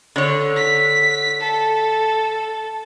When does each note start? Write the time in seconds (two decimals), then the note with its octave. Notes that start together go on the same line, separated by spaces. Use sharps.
0.16 D3 C#5
0.56 B6
1.41 A4